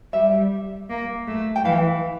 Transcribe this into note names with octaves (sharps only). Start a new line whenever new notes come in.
G3 E5
A#3
A3
G5
E3 F5